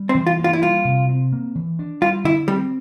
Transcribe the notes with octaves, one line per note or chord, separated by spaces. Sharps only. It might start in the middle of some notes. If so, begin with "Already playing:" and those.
Already playing: G3
C4
E3
F4
A#3
F4
E4
G3 F4
C3
C4
A#3
E3
D4
G3 F4
D3 E4
G3 C4